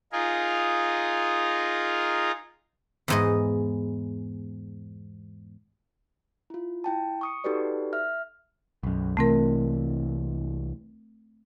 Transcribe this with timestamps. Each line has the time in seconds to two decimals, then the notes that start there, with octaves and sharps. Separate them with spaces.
0.12 D#4 F4 G#4 A#4
3.08 E2 G#2 D#5
6.50 E4 F4
6.84 E4 G5 A5
7.21 C#6 D#6 C#7
7.44 D#4 F#4 G4 A4 B4 D5
7.93 E5 F6
8.83 B1 F#2
9.17 C2 C3 E3 A3 C4 A#4